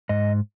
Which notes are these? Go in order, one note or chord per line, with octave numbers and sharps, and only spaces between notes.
G#2 D#5